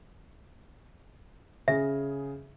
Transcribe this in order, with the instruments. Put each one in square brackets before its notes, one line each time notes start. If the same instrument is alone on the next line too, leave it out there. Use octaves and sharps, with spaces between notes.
[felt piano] C#3 G#4 [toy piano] E5